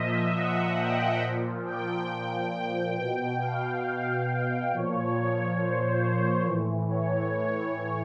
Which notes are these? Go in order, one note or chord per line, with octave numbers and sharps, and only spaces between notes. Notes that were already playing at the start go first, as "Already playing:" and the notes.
Already playing: A#2 F3 D#5 E5
F#5
G5
A#2 F3
G5
G5
G5
B2 G5
F5
G5
A#2 F3 C#5
C5
A2 E3
C#5